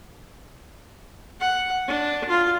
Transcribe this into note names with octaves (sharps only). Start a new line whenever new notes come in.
F#5
D4
F4